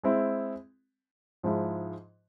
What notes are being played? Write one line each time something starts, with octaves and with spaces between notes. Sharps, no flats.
G#3 C4 E4
G#2 F3 G#3 E4